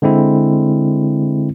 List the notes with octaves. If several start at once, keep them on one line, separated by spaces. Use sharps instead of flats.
D3 G#3 C4 E4